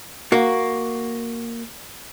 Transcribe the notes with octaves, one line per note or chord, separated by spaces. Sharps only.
A#3 F#4